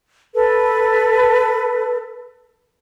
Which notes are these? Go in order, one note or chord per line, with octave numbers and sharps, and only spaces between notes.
A4 B4